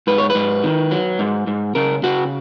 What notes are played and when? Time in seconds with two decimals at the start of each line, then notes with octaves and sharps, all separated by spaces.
0.07 G#2 B4
0.18 C#5
0.30 B4
0.35 G#2
0.64 D#3
0.91 F#3
1.19 G#2
1.47 G#2
1.75 C#3 A#4
2.03 C#3 F#4